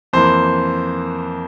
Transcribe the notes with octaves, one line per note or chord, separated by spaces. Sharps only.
F2 E3 A#3 C5